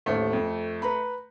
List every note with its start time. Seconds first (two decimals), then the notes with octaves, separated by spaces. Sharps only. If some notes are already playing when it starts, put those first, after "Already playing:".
0.06 A1 D#2 A3 C5
0.33 F2
0.82 B4 A#5 B5